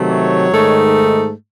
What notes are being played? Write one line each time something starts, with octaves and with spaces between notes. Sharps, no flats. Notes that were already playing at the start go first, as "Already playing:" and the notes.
Already playing: C3 D#3 F#3 A3
C#5
G#2 D#3 A3 D#4